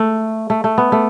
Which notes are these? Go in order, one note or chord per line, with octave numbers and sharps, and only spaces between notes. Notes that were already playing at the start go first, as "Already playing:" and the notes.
Already playing: A3
A3
A3
B3
A3